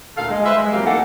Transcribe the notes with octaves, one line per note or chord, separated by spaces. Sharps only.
D2 A#2 A4 F5
G#3
B4 C5 E5
G#3
F2 E3 F#3 A#3 G4 F5
E3 A3 A#3 D#4 A4 F#5